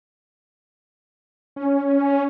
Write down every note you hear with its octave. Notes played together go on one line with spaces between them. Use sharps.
C#4